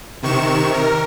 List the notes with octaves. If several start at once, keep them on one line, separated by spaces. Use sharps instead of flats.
C3 D#3 C#6 E7
A#4